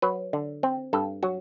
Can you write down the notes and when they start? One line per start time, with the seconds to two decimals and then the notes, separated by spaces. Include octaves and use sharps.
0.02 F#3 B4
0.33 D3
0.63 C4
0.93 G2 A4
1.23 F#3 F#4